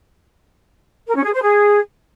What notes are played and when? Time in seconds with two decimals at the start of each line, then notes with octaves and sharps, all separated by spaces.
1.07 A#4
1.16 C#4
1.25 G#4
1.34 C5
1.42 G#4